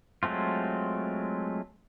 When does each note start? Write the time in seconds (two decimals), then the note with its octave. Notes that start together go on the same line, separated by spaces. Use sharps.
0.23 F#3 G#3 A3 C4 F4